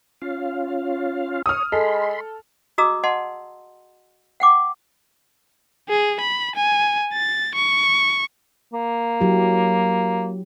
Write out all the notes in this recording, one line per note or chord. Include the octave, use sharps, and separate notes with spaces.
C#4 F4 F5
C#5 D#6 F6
G#3 A4 B5 C6
F#4 G#4 D#5 A#5 D#6 E6
D#5 F#5 A5 C6
F#5 G5 D6
G#4
B5
G#5
A6
C#6
A#3
F#3 E4 G4